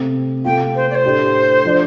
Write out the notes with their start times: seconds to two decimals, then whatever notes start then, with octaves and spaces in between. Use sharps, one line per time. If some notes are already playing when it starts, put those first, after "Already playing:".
Already playing: C3 A3 C4
0.45 C3 A3 F4 G5
0.75 C5
0.90 D5
0.94 C5
1.04 A2 A3 D4 G4
1.65 F3 D4